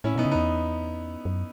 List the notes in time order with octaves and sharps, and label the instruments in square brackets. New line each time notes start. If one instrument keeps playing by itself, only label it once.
[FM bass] A2 [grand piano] C#4 E4
[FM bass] B2 [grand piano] B3 D#4
[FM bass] C#3
[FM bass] E2 [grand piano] B3 D#4
[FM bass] F#2